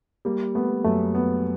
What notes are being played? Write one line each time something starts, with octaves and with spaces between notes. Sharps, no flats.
G3 A#3
A3 B3
F#2 A3
B3